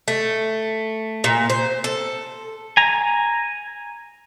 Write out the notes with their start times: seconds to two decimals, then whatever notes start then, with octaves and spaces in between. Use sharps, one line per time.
0.08 A3
1.24 A#2
1.50 C5
1.84 A4
2.77 G#5 A#5